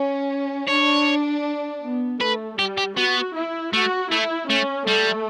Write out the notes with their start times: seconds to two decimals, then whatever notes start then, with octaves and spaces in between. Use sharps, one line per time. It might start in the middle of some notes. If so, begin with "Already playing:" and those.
Already playing: C#4
0.68 D4 C#5
1.83 B3
2.20 A3 B4
2.59 G3 G4
2.78 G4
2.96 B3 F#4
3.35 E4
3.73 A3 F#4
4.11 A3 E4
4.49 A3 C#4
4.87 G3 A3